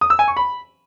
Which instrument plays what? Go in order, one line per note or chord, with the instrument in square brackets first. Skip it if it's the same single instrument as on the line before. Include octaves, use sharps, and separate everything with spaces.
[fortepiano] D#6
E6
G#5
C#6
B5